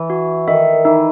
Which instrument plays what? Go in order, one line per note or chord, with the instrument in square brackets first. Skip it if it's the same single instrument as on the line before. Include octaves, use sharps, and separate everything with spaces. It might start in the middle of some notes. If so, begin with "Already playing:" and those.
Already playing: [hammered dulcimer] E3
[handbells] F#4
[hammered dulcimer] D#3 [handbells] E5
[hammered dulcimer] E3 [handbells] D#4